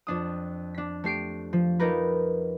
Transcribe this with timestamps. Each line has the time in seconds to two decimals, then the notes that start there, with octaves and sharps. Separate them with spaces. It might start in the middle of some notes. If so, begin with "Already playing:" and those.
0.07 F2 D4 D#6
0.75 D4 B6
1.04 A3 G4 C7 D7
1.53 F3
1.80 D#4 F4 G4 A#4 B4